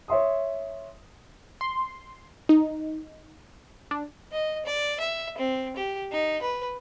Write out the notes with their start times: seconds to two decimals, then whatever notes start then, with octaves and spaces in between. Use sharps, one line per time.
0.08 C#5 E5 C6 D#6
1.61 C6
2.49 D#4
3.91 D4
4.32 D#5
4.65 D5
5.00 E5
5.38 C4
5.76 G4
6.12 D#4
6.42 B4